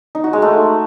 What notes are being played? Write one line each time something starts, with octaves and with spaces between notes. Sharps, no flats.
D#4
F#4
G#3
A3